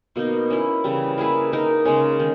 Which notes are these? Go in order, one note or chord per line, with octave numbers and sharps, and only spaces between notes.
B2 A#3 D#4
A#3 C#4 E4
C#3 E3 G3
A#3 E4 G#4 B4
A#3 D#4 A#4
C#3 G#3 C#4
D#3